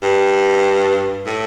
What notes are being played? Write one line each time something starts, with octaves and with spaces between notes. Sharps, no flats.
G2
A2